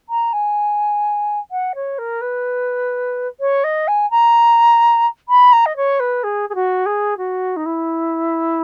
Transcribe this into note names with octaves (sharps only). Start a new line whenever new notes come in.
A#5
G#5
F#5
C#5
A#4
B4
C#5
D#5
G#5
A#5
B5
A#5
D#5
C#5
B4
G#4
G#4
F#4
G#4
F#4
D#4
E4